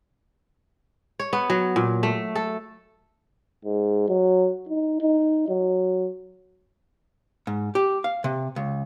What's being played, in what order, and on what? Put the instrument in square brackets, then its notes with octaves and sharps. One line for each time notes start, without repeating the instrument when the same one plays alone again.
[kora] C#5
B3
F#3
A#2
A3
A4
[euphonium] G#2
F#3
D#4
D#4
F#3
[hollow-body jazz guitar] G#2
G4
F5
C3
C#2